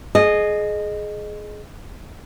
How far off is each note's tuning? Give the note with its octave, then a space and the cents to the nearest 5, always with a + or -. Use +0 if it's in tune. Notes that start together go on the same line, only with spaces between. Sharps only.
G#4 +20 D#5 -15